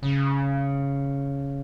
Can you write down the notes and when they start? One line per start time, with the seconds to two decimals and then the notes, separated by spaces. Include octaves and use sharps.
0.03 C#3